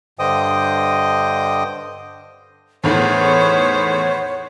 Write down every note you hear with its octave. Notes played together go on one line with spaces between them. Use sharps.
G2 D3 C5 D#5 G5 D#6
E2 A2 D#3 B3 C5 C#5